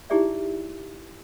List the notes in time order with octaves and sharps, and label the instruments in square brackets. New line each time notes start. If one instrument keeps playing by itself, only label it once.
[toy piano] D#4 E4 G4 G#4 D5 E5